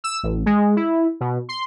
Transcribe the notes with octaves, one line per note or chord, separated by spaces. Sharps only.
E6
A1
G#3
E4
B2
C6